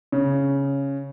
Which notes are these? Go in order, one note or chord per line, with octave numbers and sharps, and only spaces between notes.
C#3